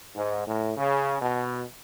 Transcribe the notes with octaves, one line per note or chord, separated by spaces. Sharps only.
G#2
A2
C#3
B2